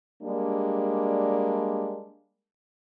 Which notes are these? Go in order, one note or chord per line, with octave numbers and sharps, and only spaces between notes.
G3 G#3 A#3 D4